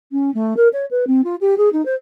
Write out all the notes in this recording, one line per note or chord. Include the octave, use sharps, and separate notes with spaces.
C#4
A3
A#4
C#5
B4
C4
F4
G4
G#4
D#4
C5